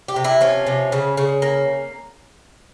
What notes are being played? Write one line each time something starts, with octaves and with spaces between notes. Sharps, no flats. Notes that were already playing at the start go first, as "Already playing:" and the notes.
G4
C3
E4
F3 C#4
C3
C#3
C#3
A#3